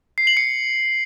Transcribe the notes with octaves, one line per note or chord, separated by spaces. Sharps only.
C7
F#7
C#7